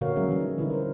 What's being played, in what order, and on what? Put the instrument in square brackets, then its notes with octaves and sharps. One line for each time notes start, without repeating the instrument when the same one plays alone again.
[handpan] A#2 D3 F#4 A#4 C#5 F5
F#3 G#3 C#4 G#4 A#4 E5
E3 G3
D#4
D3 E3 D#4 E4
A#4 C5